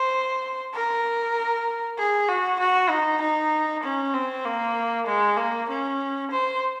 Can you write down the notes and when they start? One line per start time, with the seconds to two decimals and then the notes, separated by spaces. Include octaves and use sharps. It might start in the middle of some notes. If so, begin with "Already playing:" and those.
Already playing: C5
0.74 A#4
1.98 G#4
2.29 F#4
2.60 F#4
2.90 D#4
3.21 D#4
3.83 C#4
4.14 C4
4.45 A#3
5.07 G#3
5.37 A#3
5.69 C#4
6.31 C5